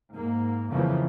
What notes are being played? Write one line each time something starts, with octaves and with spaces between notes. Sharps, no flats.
G#2 A#3
F2 C#3 E3 F3 A#3